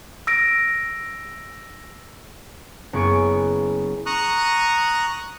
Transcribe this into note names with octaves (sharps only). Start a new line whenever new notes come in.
E6 A#6 D7
F#1 B3 G#4 C#6 G#6 D7
A#5 C#6 D#6 F#6